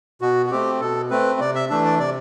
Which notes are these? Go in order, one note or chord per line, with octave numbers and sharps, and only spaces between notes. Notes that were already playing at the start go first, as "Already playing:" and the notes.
B2 F#4
F#4
A3 C4 G4
B2 A4
A3 C4 B4
C3 D5
E5
E3 A3 D4 E5
D5
C3 D5